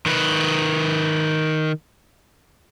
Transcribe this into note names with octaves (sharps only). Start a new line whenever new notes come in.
D#3 B4